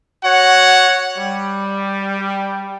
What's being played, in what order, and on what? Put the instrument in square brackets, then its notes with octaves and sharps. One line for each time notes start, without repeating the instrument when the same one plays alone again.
[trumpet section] F#4 C#5 F#5
G3